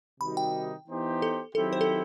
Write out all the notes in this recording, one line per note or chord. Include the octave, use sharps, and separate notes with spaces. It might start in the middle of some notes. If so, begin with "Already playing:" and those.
C3 D#3 G3 D#4 F#4 B5
G5
E3 B3 D#4 G4 C5
A4
D#3 F#3 C4 E4 G4 A4
C5
A4